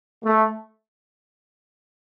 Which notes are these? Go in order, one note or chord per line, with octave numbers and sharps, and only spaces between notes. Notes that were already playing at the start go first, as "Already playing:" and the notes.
A3